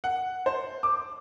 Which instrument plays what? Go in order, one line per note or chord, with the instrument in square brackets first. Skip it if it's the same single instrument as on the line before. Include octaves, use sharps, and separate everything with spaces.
[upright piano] F#5
C5
D6